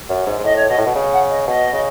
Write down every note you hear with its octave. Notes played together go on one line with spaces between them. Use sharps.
F#2
G#2
G#2
A2 D#5
C#5
B2 D#5
A2
B2
C#3
F#5
D#5
B2 D#5
C#3